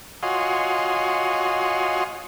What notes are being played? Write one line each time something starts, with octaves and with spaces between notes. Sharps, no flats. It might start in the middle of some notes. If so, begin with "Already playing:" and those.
F4 F#4 C#5 D#5 G#5 C6